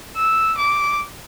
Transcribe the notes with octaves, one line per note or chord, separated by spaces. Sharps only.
E6
D6